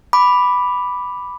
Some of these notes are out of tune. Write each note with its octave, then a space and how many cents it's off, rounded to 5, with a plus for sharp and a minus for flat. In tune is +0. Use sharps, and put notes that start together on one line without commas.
B5 +0 D6 +0